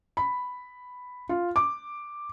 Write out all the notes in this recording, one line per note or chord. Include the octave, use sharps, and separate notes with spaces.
B5
F4
D6